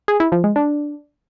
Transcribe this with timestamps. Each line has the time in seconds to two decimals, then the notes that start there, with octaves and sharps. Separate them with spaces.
0.08 G#4
0.20 E4
0.32 F3
0.44 G#3
0.56 D4